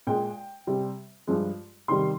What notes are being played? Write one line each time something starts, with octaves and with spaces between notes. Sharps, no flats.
A#2 G#3 G5
C3 G3
G2 F3 G#3
C3 D#3 G3 C6